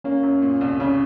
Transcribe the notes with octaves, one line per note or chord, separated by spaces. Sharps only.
A#3 C#4
F#2
A#2
C2
C#3 C#4